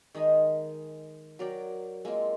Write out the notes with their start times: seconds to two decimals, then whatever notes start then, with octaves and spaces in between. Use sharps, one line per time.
0.15 D#3 G#3 D#4 D#5
1.39 F#3 A#4 D5 G5
2.05 G#3 A#3 C4 F4